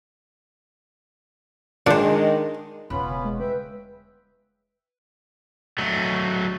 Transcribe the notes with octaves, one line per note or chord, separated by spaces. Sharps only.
A#2 D#3 G#3 D4 C5
E1 C#3 B3 C#4 F4 B5
G#3
B4 E5 G5
F#3 A3